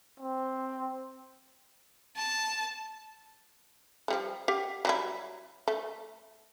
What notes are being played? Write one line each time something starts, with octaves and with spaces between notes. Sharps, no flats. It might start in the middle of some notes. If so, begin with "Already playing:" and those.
C4
A5
F3 G3 A3
G4 F5 F#5
F#3 G3 E4
A3